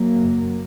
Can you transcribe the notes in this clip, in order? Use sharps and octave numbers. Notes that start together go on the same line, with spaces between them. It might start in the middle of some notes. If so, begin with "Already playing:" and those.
Already playing: F#3 A#3
F#1 F#2